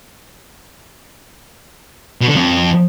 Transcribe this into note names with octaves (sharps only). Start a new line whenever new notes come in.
B2
D3
F2